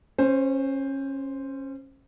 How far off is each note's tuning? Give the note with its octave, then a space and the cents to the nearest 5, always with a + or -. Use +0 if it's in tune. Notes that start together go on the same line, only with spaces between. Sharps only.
C#4 -25 C5 +0